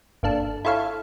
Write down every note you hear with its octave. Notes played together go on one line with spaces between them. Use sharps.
G1 A#3 D4 A4
E4 F4 A4 C#5 F5